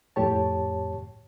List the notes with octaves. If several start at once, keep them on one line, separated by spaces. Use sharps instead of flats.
F2 A2 G4 C#5 A5